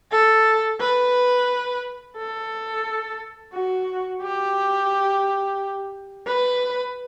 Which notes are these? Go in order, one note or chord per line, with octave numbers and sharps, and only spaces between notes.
A4
B4
A4
F#4
G4
B4